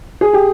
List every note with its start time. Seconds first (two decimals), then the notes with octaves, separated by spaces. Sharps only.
0.21 G#4
0.33 G4